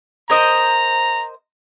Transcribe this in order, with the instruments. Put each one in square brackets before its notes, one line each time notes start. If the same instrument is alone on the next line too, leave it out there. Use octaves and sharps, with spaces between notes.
[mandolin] A#4 C5 D#5 [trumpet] A#5